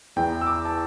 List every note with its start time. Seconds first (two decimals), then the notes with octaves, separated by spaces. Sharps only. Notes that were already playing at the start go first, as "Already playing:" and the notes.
0.16 E2 E3 G5
0.41 E6
0.47 D6
0.65 A5